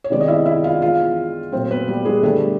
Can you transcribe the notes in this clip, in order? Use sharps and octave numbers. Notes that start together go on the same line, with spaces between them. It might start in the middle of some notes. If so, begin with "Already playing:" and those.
C#5
C3 D#3 G#3 B3 D5
D#5
E4 E5
E4 E5
F4 F5
E3 G#3 B3 F4 F5
A#2 F#3 A3 C4 C5
B3 B4
G3 G4
G#3 G#4
D3 G3 A3 B3 A4